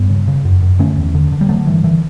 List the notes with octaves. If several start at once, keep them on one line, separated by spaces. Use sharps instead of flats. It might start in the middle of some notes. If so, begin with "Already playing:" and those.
Already playing: G2 G3 B3
C#3
C#3
F#2
F#2
D3 A3 C#4
E2
D3
D3
G3
D3 F#3 A3
G2 E3
D3 E3